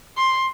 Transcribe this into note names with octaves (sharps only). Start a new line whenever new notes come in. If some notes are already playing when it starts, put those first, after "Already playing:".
C6